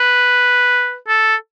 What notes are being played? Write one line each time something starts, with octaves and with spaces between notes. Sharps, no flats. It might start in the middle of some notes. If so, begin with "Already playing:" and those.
Already playing: B4
A4